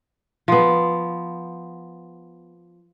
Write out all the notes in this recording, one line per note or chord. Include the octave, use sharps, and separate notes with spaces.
F3 B3